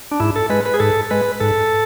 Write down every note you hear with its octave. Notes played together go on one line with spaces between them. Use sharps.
D4
G#2 E4
A4
G#3 B4
B4
G#4
G#2 A4
G#3 B4
G#2 A4